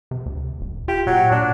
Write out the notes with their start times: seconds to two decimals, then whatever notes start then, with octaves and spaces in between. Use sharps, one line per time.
0.11 C3
0.26 D2
0.61 D#1
0.88 F4 G4
1.06 A#2 F#3
1.31 A#2 D4